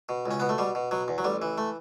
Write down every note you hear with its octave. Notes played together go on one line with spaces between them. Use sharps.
B2
C#2
C#4
B2 B3
A3
B2 G3
B2
B2 F#3
E2
F#3
A1 G3
E3
A3